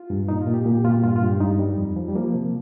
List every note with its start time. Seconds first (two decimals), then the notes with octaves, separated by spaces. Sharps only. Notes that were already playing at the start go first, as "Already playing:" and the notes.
Already playing: F4
0.10 G2
0.29 A#2 D#4
0.41 F4
0.47 A#2
0.54 G4
0.66 A#2
0.75 G4
0.85 A#2 F4
0.93 G4
1.03 G2 F4
1.16 F4
1.22 G2
1.28 G4
1.41 G2 D#4
1.59 G3
1.78 F2
1.96 F3
2.08 G3
2.15 F3 A#3
2.34 C3